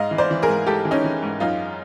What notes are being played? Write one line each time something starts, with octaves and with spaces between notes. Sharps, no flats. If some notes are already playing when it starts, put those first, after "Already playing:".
Already playing: G#2 D#5 F5
E3
C5 D5
E3
G#4 A#4
G#2
G#2 G4 A4
E3
C#4 D#4
E3
G#2
F#2 D#4 F4